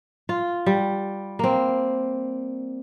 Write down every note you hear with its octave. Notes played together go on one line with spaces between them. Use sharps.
F4
G3
A#3 C4